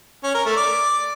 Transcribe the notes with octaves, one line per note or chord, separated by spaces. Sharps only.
C#4
A#4
A3
D5